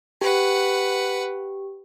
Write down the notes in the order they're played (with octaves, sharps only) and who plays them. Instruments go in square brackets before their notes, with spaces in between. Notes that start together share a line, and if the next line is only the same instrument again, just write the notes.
[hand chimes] G4 [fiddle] B4 F#5